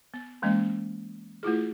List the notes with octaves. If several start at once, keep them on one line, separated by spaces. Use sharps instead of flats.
B3
E3 G#3 A#3 C#4 D#5
A3 E4 F4 G#4